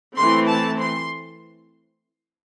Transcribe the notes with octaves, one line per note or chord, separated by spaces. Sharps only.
E3 A3 C4 C6
A5
C6